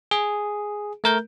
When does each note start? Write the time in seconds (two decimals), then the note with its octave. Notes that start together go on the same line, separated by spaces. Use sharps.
0.11 G#4
1.04 A3 A#4 G6